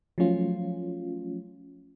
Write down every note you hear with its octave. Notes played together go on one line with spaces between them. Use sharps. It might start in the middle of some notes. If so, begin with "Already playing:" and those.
F3 F#3 A3 C#4 F4